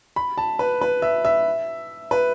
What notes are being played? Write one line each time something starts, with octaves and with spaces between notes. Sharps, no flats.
B5
A5
B4
B4
E5
E5
B4